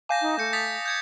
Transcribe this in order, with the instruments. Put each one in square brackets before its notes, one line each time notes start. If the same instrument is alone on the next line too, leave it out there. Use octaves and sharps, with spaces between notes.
[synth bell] F5 G#5 A5 [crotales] D6 G6 A#6
[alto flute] D#4
[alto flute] A3 [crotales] G6 C#7
[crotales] D#6 A6 B6
G6 G#6 C#7